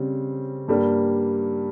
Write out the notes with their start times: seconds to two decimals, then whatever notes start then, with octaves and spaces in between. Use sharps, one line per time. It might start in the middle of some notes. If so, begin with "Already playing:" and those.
Already playing: C#3 G3 C4
0.68 G2 G3 A#3